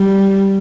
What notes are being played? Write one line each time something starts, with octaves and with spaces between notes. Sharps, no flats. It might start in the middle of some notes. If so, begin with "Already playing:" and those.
Already playing: G3